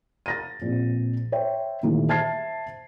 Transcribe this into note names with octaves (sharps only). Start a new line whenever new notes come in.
A6 A#6 D#7
A#1 C4
C5 C#5 E5 G5
A#2 D#3 E3 G3 A3
C5 E5 A5 G#6 A6 C7